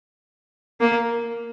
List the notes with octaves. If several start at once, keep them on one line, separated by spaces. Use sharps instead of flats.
A#3